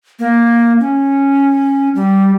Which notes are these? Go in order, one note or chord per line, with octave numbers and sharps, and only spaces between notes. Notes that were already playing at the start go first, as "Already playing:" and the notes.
A#3
C#4
G3